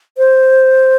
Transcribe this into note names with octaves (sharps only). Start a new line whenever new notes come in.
C5